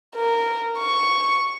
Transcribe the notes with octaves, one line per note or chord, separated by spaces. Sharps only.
A#4
C#6